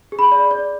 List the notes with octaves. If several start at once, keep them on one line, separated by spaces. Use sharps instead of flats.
G#4
B5
D5
D5